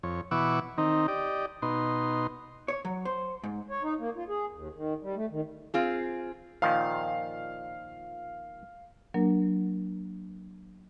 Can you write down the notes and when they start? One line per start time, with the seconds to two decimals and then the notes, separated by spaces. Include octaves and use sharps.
0.03 F2 C#5
0.31 B2 E3 F#5 C#6 D6 E6
0.78 D#3 C4 D#4
1.08 G4 D5 D#5
1.62 B2 D#4 C6
2.68 C#5
2.85 F#3
3.05 C5
3.44 G#2
3.70 C#5
3.83 D#4
3.99 A#3
4.16 F4
4.29 G#4
4.55 D#2
4.76 D#3
5.02 G3
5.16 A3
5.31 D#3
5.74 C4 F4 G#4
6.62 A#2 D#3 F3 F5
9.14 F#3 A#3 D4 A#4